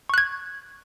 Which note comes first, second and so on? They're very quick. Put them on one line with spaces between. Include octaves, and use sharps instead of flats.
C#6 F#6 G#6